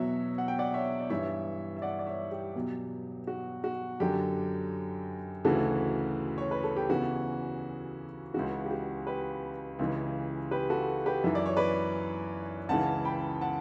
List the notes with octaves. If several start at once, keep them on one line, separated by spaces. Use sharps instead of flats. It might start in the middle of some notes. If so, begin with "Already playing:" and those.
Already playing: E2 B2 F#3 C#5 E5
F#5
G5
D5 F#5
C#5 E5
D5
G2 E3 C#5 E5
E5
D5 F#5
D5
C#5 E5
G4
E2 B2 F#3
F#4
F#4
F#2 D3 F#3 G4
D2 C#3 E3 F#4 A4
C#5
B4
A4
G4
E2 C#3 E3 F#4
C#2 C#3 E3 F#4
G4
F#4
G4 B4
C#2 C#3 E3
G4 B4
F#4 A4
G4 B4
F#2 E3 E5
D5
C#5
B4 D5
C#2 C#3 E3 F#5 A5
G5 B5
F#5 A5